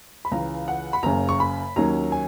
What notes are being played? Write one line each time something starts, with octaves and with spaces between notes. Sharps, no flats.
B5
C#2 C#3 E3 A#5
F#5
B5
F#1 F#2 C#3 A#5
C#6
B5
D#2 D#3 F#3 C#4 A#5
G#5